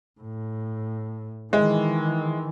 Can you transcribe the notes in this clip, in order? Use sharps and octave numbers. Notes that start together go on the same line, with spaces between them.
A2
D#3 E3 G#3